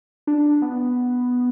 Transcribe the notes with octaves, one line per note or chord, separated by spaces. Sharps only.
D4
B3